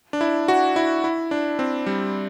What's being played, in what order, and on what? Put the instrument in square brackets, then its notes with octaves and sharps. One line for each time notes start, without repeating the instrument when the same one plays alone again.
[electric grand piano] D4
E4
F#4
E4
E4
D4
C4
G3